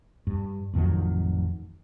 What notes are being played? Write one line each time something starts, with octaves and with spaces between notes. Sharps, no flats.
G2
A1 F2 D#3 F#3